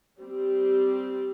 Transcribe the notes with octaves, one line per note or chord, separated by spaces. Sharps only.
G3 C4 G4